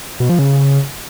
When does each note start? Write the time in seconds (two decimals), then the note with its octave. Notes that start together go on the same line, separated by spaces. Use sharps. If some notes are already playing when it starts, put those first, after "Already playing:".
0.20 B2
0.29 F3
0.39 C#3